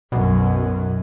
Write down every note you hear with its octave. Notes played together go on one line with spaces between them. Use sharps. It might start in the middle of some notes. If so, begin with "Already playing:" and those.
B1 F#2 B2